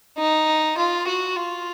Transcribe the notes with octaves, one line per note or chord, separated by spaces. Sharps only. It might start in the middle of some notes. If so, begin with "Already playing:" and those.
D#4
F4
F#4
F4